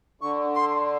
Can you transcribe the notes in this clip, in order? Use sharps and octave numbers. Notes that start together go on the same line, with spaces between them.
D3 C#6
C6